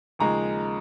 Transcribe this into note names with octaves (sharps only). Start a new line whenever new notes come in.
D#2 C#3 F3 G#3 A#5